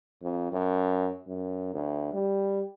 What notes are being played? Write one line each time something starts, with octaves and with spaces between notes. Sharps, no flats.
F2
F#2
F#2
D2
G3